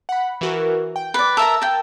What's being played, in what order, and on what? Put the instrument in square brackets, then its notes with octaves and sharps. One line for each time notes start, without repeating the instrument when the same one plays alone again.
[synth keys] F#5 B5
E3 F#4 A#4
G5
[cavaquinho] B4 D5
[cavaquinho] A#4 E5 A#5 [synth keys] A5 E6
[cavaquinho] A#4 G5